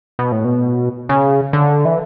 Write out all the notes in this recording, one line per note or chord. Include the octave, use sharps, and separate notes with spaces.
B2
A2
B2
C#3
D3
E3